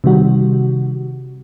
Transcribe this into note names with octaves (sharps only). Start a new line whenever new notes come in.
C3 D#3 G3 F#4